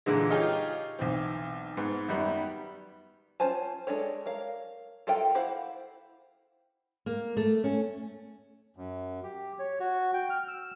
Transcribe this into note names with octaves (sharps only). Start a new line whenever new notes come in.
A#2 D3 E3 G#3
D#4 F4 G4 G#4 C#5
B1 E3 C4
G#2 B3
F#2 D#3 G3 B3
C#4 F4 C5 G#5 A5
G#3 D4 A4 C#5
A#4 C#5 F5
F4 A4 A#4 E5 G5
E4 C5 F5 F#5
A#3
A3
C#4
F#2
G4
C#5
F#4
G5
F6
E6